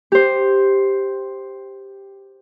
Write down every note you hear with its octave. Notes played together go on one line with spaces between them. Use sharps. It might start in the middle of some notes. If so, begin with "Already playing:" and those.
G4 C5